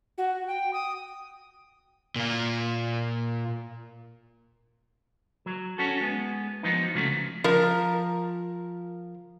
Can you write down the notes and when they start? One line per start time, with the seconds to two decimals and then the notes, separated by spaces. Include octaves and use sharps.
0.18 F#4
0.47 G5
0.73 D#6
2.16 A#2 F4
5.46 F#3
5.78 C#4 F#4 A4
6.01 G#3 B3
6.63 F3 F#3 B3 D#4
6.94 C#2 C#3 F3 F#3 A3
7.44 F3 A#4